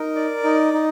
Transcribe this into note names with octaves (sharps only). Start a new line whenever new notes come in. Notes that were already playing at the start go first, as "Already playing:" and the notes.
Already playing: D#4 A#4
D5
D#4
D#4